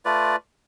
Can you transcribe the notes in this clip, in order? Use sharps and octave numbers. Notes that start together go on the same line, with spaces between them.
A3 F4 B4 D5